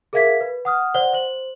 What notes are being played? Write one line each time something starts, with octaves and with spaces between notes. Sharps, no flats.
G#4 A#4 E5 F5 G#6 B6
B4
F#5 D#6 F6
C5 D5 F#5 G7
C5 F#7